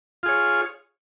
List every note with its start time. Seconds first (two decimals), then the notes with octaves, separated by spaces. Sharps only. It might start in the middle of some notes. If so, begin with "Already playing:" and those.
0.23 F4
0.26 G#4
0.28 C#5